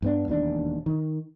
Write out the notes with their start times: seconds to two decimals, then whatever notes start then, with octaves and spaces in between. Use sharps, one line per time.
0.02 G2 B3 D4
0.28 E1 D#2 D4
0.86 D#3